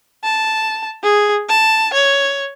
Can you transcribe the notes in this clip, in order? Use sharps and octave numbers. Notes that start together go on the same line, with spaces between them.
A5
G#4
A5
C#5